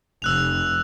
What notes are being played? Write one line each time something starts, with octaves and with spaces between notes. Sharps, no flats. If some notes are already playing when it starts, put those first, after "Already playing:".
F1 E6 F#6 F7